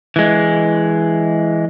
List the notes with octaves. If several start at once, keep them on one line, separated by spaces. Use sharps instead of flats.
E3 G#3